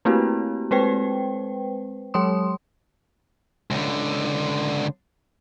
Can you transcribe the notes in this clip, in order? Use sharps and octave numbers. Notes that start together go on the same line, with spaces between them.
A3 A#3 C4 E4 F#4 G4
G#3 C4 B4 C5 G5
F#3 G#3 C#5 C6 D#6
C#2 D3